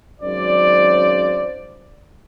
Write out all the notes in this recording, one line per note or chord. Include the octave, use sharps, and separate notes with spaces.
G#1 F#2 C#3 F#3 C5 D5